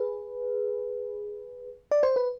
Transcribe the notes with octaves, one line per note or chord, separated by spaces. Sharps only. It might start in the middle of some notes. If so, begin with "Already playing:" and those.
Already playing: G#4 B4
D5
C5
B4